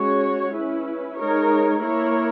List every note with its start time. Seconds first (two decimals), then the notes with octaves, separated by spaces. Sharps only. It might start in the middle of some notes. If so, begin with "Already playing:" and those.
Already playing: G#3 C#4 F#4 C#5
0.55 C#4 E4 B4
1.18 G#3 D#4 A#4 C#5
1.80 A#3 E4 A#4 C#5